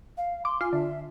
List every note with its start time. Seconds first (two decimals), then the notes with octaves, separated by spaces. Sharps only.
0.17 F5
0.45 C6 D6
0.61 F4 G#5
0.73 D3 E5